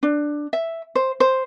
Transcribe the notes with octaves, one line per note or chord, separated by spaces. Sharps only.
D4
E5
C5
C5